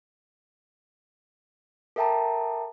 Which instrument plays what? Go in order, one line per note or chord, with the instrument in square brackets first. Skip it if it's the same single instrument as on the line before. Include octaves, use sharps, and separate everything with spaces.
[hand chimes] A4 A#4 E5 G5 A5 A#5